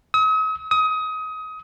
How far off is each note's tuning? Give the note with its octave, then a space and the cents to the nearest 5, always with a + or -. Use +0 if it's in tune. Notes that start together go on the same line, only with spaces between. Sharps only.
D#6 +45
D#6 +25